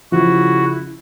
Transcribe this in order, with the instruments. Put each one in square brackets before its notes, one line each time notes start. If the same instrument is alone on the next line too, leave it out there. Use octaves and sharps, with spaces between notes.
[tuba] C#3 [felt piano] F3 [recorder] E4 [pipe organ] F#4